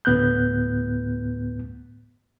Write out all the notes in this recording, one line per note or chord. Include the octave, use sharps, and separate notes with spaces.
D2 A2 B3 F#6 G6